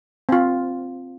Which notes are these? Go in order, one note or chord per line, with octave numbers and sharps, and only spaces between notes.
C4 F4